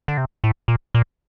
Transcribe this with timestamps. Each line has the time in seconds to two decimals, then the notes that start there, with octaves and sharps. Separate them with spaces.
0.08 D3
0.18 C3
0.44 A2
0.68 A#2
0.95 A#2